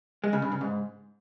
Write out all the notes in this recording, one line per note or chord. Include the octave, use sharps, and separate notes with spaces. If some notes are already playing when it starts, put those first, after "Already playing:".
G#3
C#3
G2
C#3
G#2